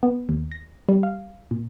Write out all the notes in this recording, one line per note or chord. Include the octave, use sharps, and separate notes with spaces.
B3
D#2
A#6
G3
F5
A#2